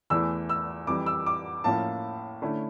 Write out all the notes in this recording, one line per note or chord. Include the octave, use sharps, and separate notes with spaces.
E2 E3 A3 E4 E6
E6
F2 E3 G3 D6
E6
D6
A2 F3 A#3 C#4 E4 A5
D3 A3 C#4 E4